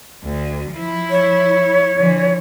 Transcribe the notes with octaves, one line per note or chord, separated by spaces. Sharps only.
D2
F3 E4
C#5
D3 E3 F3